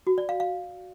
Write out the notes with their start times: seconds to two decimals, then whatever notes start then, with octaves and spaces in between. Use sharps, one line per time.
0.07 F#4
0.18 D5
0.29 F5
0.40 F5